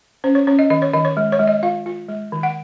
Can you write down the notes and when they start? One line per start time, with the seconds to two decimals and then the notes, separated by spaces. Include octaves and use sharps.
0.24 C#4 C5
0.35 C#5
0.47 C#4 C#5
0.59 D#5
0.70 D#3 D#5
0.82 C#5
0.93 D#3 D#5
1.05 C#5
1.17 G#3
1.32 C#5
1.39 G#3
1.47 D#5
1.63 F4 F5
1.86 F4
2.08 G#3
2.32 D#3
2.43 F#5